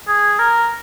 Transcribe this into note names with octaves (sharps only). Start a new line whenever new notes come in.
G#4
A#4